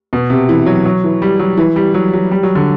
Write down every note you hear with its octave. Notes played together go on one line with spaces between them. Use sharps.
B2
C3
E3
F#3
F#3
E3
G3
F#3
E3
G3
F#3
F#3
G3
F#3
D3